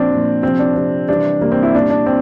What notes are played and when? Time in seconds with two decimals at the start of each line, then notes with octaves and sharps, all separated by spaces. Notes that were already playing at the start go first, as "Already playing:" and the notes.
Already playing: A#2 F3 C4 D4
0.11 A#2 F3
0.43 C3 F3 C4
0.59 D4
0.75 C3 F3
1.08 C3 E3 G3 D4
1.41 C3 E3 G3 A#3
1.52 C4
1.63 E4
1.74 A#2 G3 D4
1.90 D4
2.06 C4